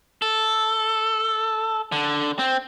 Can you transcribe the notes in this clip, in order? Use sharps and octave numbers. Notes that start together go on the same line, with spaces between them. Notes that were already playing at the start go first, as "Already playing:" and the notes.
A4
D3
C4